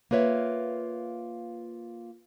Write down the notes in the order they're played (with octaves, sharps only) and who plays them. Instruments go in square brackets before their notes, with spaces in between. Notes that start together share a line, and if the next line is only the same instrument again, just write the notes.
[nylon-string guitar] A#3 F4 B4 C#5 E5